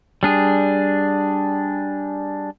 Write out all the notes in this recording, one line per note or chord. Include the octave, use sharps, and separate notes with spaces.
G3 D4 G#4